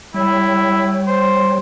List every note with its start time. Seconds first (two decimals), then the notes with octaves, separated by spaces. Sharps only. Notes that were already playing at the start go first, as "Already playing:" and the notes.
0.14 G3 E4 C#5 G5
1.07 C5